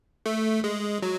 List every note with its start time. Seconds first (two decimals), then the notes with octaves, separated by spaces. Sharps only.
0.26 A3
0.64 G#3
1.02 F#3